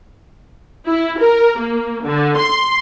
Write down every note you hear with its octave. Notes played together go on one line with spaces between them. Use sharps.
E4
A#4
A#3
D3
C6